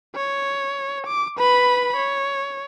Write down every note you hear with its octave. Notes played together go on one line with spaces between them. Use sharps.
C#5
D6
B4 B5
C#5